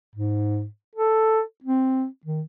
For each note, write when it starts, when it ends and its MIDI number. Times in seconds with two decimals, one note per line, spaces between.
0.15 0.66 44
0.95 1.42 69
1.64 2.06 60
2.25 2.42 51